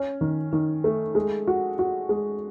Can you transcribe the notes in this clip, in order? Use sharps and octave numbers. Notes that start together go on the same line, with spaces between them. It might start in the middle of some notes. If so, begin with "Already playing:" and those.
Already playing: C#4
D#3
D#3
A3
G#3
F#4
F#4
G#3